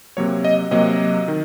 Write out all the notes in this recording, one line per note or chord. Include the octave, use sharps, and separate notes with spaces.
C3 F#3 A#3 C#5
D#5
C3 F#3 A#3 D#5
D#3